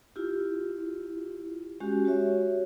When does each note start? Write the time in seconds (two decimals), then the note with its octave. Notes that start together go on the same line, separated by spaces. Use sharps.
0.16 E4 F4 G4
1.80 G#3 C#4 F#4 G4
2.05 F#4 G4 C#5 E5